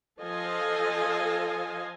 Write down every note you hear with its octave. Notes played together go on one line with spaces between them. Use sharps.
F3 A4 D#5 F5 G#5